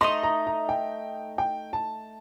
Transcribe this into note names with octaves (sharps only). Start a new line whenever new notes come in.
A3 D#4 A4 D#5 C6
A#5
A#5
G5
G5
A5